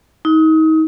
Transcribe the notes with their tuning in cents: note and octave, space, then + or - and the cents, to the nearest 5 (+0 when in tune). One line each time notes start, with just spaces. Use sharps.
D#4 +30